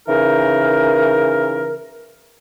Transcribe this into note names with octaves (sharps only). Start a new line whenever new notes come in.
C#3 E3 D#4 A#4